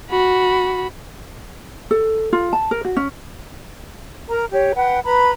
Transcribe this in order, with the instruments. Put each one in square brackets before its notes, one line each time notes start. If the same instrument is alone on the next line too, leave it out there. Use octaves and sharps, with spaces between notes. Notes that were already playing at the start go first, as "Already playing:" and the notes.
[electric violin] F#4 B5
[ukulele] A4
F4
A5
A#4
F#4
C#4
[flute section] A#4 A#5
G4 C#5
B4 F#5 G5
B4 A#5 B5